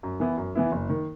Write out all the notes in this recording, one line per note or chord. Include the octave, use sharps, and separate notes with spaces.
F#2
E3 B3 E4
F#2
E3 B3 E4
F#1
D#3